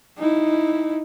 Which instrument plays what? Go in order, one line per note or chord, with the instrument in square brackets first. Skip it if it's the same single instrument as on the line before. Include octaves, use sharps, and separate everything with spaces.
[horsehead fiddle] D#4 E4